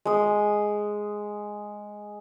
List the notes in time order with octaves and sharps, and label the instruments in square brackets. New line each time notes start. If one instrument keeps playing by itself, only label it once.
[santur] G#3 D#6